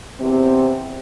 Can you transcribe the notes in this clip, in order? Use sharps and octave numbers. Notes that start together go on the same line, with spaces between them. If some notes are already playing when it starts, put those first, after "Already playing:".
E2 C3 C4